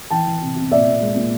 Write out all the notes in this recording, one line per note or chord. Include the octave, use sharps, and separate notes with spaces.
E3 G5 A5
E3
C3
C3
A#2 D5 E5
A#2
G#3
A#2